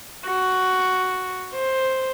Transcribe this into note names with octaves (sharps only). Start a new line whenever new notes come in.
F#4
C5